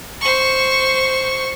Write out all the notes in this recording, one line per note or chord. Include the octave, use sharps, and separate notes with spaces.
C5 C#6